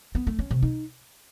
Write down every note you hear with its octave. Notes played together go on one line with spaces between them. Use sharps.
B3
A3
C#4
C3
D#4